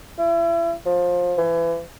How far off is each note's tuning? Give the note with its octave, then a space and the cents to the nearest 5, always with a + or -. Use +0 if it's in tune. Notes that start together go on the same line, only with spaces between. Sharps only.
E4 +35
F3 +20
E3 +30